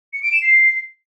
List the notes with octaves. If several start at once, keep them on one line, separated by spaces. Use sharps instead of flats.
C#7
D7
E7
C7